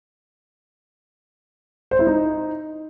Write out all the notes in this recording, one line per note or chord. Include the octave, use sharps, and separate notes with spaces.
C5
E4
D#4